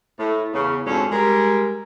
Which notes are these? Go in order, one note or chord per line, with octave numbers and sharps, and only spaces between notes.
A2
E2 C#3
F2 G#2 D3 F#3 C#4
G3 G#3 A#4